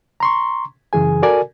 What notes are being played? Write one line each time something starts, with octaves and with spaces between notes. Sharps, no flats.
A#5 C6 C#6
F#2 C#3 E3 G#4 G#5
F#4 A4 A#4 D5 G#5